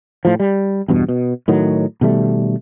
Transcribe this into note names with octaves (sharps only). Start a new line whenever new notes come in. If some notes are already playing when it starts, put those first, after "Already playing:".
A2 F3
G3
E2 G2 B2
B2
A2 D#3 F#3
B2 D#3 G3 A3